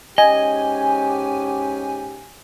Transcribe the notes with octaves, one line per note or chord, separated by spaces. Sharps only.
G#2 C#4 G4 D#5 G#5